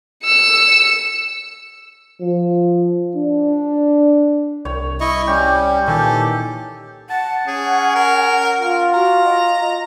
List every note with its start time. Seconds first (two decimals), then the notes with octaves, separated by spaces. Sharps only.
0.24 E6 C#7
2.22 F3
3.16 D4
4.65 C2 C#5
5.01 E4 D#5 C#6
5.27 G3 C#4 G4
5.87 A#2 D#3 E3 G4 A4 G#5
7.10 F#5 A5
7.48 C#4 G#4
7.95 A#4
8.60 F4 A#4
8.94 F#4 A#5
9.24 D#5